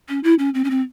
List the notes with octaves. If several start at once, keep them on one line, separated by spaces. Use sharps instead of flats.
C#4
E4
C#4
C4
C#4
C4